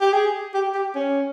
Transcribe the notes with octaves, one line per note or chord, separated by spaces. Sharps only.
G4
G#4
G4
G4
C#4